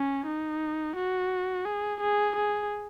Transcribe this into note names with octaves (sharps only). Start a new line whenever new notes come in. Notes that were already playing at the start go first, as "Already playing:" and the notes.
Already playing: C#4
D#4
F#4
G#4
G#4
G#4